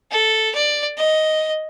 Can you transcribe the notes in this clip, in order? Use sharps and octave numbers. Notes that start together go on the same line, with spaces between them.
A4
D5
D#5